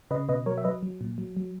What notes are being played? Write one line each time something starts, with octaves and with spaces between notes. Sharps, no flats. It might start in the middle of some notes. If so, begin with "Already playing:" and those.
C#3 B4 D#5
B2 B4 D#5
F#3 A#4 C#5
E5
F#3 B4 D#5
F#3
A#2
F#3
F#3